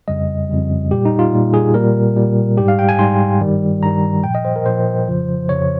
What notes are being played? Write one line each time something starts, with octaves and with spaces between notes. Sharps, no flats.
F2 C#3 G3 D#5
F2 C#3 G3
A#2 G3 G4
D#4
F4
A#2 G3
G#4
A#2 G3 A#4
A#2 G3
G#2 G3 G4
F5
G5
G#5
G#2 G3 C6
G2 D#3 G3
G2 D#3 G3 A#5
A#2 F3 G5
D#5
C5
A#4
A#2 F3 C5
F2 C#3 F3
F2 C#3 F3 C#5